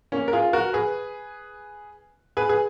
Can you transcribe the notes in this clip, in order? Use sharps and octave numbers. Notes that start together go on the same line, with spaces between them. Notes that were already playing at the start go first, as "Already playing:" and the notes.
A#3 C#4
A#4
F4 G#4
F#4 A#4
G#4 B4
G#4 B4
G#4